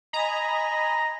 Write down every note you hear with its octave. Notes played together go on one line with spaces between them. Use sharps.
D#5 G#5 A#5 B5